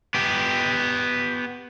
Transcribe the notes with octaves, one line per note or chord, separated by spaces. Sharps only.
B3 G4